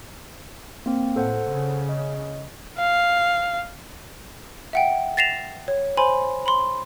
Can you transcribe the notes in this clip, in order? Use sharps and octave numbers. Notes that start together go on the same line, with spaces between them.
A#3 C4
A2 A4 C5 F#5
C#3
D#5
F5
E5 F#5 G5
A6 A#6 C7 E7 F7
C#5
C5 G#5 B5 C6
B5 C6